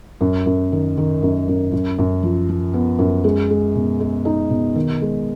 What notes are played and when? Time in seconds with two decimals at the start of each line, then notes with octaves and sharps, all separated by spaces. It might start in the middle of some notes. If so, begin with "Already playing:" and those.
0.21 F#2
0.46 F#2
0.72 D#3
0.98 D#3
1.23 F#2
1.48 F#2
1.72 F#2
1.98 F#2
2.23 F3
2.49 F3
2.74 B3
2.99 F#2
3.24 G#3
3.50 G#3
3.75 B2
4.00 G#3
4.25 D#4
4.50 B2
4.76 D#3
5.01 G#3